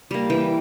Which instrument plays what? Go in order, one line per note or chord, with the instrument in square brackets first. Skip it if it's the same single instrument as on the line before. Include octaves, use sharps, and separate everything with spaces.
[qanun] G3 A#3
E3 G5